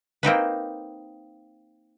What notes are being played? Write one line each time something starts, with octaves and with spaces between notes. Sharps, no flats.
A#3 C4 D#4 B4